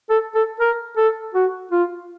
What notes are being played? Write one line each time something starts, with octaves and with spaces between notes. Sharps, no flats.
A4
A4
A#4
A4
F#4
F4